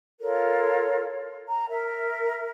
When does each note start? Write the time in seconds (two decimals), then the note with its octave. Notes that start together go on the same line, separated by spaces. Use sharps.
0.20 F4 A4 A#4 C#5
1.46 A#5
1.68 A#4 E5